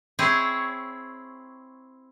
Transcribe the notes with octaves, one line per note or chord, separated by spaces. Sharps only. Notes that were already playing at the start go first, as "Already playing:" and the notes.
C4 E4 G#4 C#5